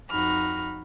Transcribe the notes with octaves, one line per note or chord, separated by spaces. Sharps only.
F2 D#4 F#4 B5 F6